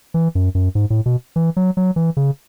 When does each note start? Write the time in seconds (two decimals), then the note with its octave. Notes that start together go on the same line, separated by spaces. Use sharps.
0.14 E3
0.35 F#2
0.55 F#2
0.75 G#2
0.90 A2
1.06 B2
1.36 E3
1.56 F#3
1.77 F#3
1.96 E3
2.17 C#3